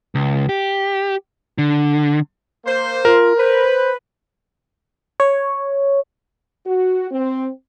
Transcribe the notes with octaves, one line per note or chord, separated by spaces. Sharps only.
C#2
G4
D3
A#3 C5
F4 A#4
B4 C5
C#5
F#4
C4